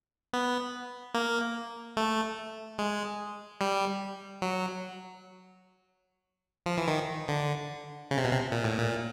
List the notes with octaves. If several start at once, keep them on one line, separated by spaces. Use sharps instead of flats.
B3
A#3
A3
G#3
G3
F#3
F3
E3
D#3
D3
C#3
C3
B2
C3
A#2
A2
A#2